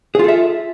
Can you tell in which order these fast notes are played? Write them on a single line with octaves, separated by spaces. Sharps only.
G#4 F4 A4 E5